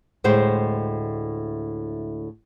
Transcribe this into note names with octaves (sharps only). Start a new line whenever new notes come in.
D2 A2 G#3 C5 G5